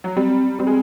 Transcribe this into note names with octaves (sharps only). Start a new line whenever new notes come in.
F#3
G3 C4
G3 C4
G#3